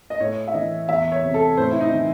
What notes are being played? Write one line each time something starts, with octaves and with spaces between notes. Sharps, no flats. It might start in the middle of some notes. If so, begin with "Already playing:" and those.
D#5
A2 C#5
E5
E3 D#5
E2 E5
C#5
C3
A4
A2 C5
E4
D#4
E3